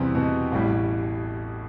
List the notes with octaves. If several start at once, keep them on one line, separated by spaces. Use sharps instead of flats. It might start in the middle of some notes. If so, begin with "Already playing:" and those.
Already playing: E2 C3 E3 G3 C4
B2 B3
A1 A2 E3 G3